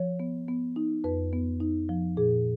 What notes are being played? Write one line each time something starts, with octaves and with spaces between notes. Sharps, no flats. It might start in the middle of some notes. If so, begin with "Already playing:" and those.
Already playing: F3 C#5
B3
B3
D#4
F2 B4
B3
D#4
F3
A#2 G#4